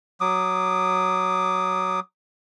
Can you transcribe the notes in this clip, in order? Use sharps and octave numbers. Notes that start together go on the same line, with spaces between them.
F#3 D6 D#6